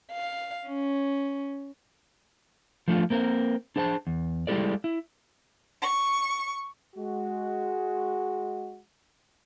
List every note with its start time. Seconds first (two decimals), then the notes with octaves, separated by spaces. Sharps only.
0.12 F5
0.68 C#4
2.88 F3 A3 D4 F4
3.10 A#3 C4 A#4
3.76 D4 G#4 C5 G#5 A5
4.07 E2
4.47 G3 G#3 E4 G4 A4 D5
4.84 E4
5.80 C#6
6.96 G#3 F#4